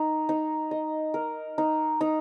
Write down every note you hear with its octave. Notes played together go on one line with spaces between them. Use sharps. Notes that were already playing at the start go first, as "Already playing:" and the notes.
Already playing: D#4
D#4
D#5
A#4
D#4
D#4